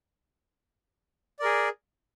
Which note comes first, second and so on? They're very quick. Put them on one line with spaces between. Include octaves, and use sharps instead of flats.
D5 A#4 G#4